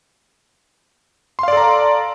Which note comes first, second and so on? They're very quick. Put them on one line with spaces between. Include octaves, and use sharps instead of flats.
C6 F5 D5 A4 A#5